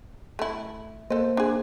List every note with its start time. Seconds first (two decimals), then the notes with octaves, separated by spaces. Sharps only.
0.39 A3 E4
1.10 A#3 A4 C5 D#5
1.37 D4 G#4